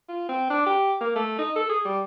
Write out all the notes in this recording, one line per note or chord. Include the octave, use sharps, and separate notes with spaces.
F4
C4
D4
G4
A#3
A3
D#4
A4
G#4
G3